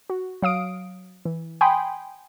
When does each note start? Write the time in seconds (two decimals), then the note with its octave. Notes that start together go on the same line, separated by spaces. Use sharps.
0.10 F#4
0.42 F#3 F5 D#6 D7
1.25 E3
1.61 G5 G#5 B5 C6 D#6